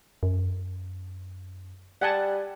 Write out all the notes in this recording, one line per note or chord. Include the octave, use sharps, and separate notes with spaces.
F#2
G3 F#5 G#5 A5